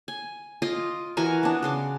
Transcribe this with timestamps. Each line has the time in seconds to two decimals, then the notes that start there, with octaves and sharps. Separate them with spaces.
0.08 G#5
0.62 F4 D#5 C6 D6
1.17 E3 F#4 A#4 G#5
1.43 B3 D4
1.63 C#3 C6 D6